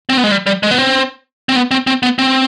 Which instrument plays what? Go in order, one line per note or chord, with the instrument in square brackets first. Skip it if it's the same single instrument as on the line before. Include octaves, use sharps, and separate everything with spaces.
[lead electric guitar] C4
B3
G#3
G3
G3
G#3
B3
C4
C4
B3
C4
C4
B3
C4